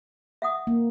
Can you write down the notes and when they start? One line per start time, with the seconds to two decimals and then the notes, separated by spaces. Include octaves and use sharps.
0.42 E5 F#5 D#6
0.67 A#3